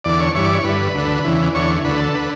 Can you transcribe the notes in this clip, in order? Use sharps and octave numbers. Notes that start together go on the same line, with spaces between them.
E2 D3 D5
C#5
G2 E3 C#5
D5
C#5
G2 D3 B4
D2 D3
E2 C#3 E3
E2 D3 C#5
D2 D3 B4
A4
D3 B4